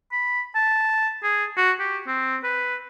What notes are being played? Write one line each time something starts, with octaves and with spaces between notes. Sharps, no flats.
B5
A5
G#4
F#4
G4
C4
B4